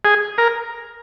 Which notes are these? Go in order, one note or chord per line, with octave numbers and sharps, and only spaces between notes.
G#4
A#4